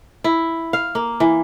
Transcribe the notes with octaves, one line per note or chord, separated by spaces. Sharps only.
E4
F5
A#3
E3